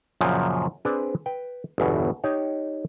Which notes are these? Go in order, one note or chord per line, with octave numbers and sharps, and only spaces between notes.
F#2 A#2 C#3 F3 F#3
C4 D4 G#4 B4 C5 D5
B4 G5
G1 E2 B2
D#4 G4 C#5